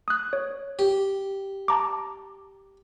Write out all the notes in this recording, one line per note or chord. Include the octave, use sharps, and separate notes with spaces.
D#6 F#6
C#5
G4
A5 A#5 D6